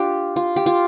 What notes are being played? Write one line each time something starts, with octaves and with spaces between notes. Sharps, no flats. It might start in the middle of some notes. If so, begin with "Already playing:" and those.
Already playing: D4 F4 G4
F4
G4
F4